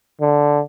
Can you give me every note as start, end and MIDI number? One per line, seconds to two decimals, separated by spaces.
0.21 0.61 50